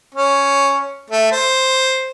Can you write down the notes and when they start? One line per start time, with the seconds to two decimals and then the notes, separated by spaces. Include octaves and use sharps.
0.15 C#4
1.10 A3
1.32 C5